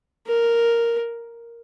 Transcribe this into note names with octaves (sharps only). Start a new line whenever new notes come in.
A#4